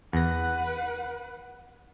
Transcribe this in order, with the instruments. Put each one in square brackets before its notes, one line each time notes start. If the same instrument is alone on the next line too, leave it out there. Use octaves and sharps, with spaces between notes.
[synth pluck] E2 A#6 [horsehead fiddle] B4 F#5